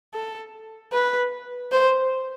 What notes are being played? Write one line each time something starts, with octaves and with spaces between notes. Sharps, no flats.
A4
B4
C5